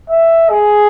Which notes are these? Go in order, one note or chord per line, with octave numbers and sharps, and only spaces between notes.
E5
G#4